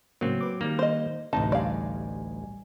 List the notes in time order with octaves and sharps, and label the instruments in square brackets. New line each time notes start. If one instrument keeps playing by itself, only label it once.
[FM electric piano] A2 C#3 A#3 [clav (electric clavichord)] F#3 C4
[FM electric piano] B4 D6
[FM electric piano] D#3 [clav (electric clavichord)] G3 A#3
[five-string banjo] C5 D#5
[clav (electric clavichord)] A1 D2 D#4 [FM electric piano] C3 [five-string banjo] A5
[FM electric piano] G3 G#5 [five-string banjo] D5 F5